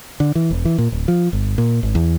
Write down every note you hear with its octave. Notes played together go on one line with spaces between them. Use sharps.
D3
E3
E1
E3
A#2
D1
F3
G1
A#2
G#1
E2